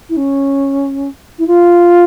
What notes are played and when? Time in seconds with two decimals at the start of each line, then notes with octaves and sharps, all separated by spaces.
0.09 E4
0.16 C#4
1.38 E4
1.47 F4